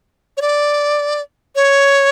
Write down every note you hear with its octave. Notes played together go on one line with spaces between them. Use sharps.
C#5
D5
C#5